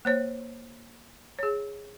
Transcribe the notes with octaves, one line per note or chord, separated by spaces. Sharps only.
A#3 C5 C#5
G#4 C#5